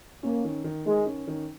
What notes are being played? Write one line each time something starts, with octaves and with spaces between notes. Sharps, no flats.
A#3 C#4
D#3
D#3
D#3 G#3
C#4
D#3